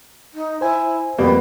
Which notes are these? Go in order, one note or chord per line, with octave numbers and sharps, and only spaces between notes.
D#4
E4 C5 G#5
F2 G3 A#3 B3